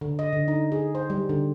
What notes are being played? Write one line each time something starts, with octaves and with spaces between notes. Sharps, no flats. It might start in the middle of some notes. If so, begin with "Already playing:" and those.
D3
D#5
D3
D#4
G#4
C5
G3
D3